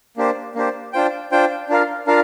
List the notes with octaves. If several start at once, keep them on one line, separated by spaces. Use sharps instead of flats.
A#3 D4 G4 C5
A#3 D4 G4 C5
D4 F4 C5 G5
D4 F4 C5 G5
D4 F4 A#4 F5
D4 F4 A#4 F5